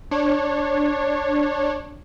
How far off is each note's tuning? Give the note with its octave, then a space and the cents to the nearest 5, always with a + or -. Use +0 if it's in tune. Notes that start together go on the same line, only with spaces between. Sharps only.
D4 +0 C#5 -20